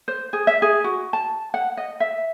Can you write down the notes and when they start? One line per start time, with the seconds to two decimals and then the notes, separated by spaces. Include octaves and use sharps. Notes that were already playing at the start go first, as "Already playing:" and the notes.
0.08 C5
0.33 G#4
0.47 E5
0.62 G#4
0.84 F#4
1.13 A5
1.54 F#5
1.77 D#5
2.00 E5